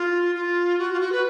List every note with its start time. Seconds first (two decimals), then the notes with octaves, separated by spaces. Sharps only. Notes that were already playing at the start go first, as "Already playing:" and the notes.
Already playing: F4
0.35 F4
0.78 F#4
0.93 F4
1.00 F#4
1.12 B4